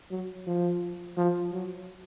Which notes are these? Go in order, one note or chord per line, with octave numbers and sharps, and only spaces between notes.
F#3
F3
F3
F#3